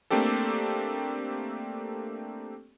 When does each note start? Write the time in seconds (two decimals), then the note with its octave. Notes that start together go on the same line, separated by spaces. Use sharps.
0.10 A3 A#3 C4 D4 G4 A4